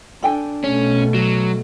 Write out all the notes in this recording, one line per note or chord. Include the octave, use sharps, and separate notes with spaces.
D4 A4 G5 G#5
B2 A3 C#4
F#3